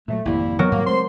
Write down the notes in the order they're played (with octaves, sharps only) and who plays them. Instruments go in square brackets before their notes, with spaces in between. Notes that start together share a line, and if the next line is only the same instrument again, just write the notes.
[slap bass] A#2 F3 F#3 [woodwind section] A3
[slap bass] G#1 F2 C3 [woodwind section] G3 A#3 E4
[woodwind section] D#3 B3 [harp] F#3 A#4
[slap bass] G#2 G3 [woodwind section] A#3
[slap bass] G#3 A3 C4 [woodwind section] C5 C6